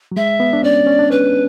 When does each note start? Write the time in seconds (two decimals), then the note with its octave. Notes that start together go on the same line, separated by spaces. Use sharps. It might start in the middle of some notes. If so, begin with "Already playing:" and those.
0.12 F#3
0.16 G#3 E5
0.40 B3
0.53 D4
0.63 C#4 D5
0.87 C#4
0.99 D4
1.11 C#4 B4